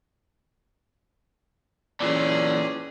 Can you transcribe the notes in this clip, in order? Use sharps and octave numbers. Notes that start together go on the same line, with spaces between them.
A#2 E3 C#4 G#4 D5